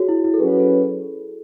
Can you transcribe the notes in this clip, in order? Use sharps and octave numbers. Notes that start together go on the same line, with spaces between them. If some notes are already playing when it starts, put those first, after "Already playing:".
Already playing: F#4 G#4 C#5
E4
E4
A4
F#3 C#4 F#4 G#4 B4
A4